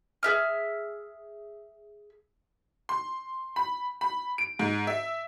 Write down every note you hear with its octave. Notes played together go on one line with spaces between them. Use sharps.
G#4 E5 F6
C6
B5
B5
D7
G#2
E5